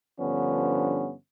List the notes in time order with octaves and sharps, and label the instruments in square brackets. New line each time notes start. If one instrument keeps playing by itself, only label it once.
[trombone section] G2 D3 F3 B3 C#4